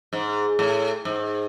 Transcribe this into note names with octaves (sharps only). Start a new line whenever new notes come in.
G#2
A2
G#2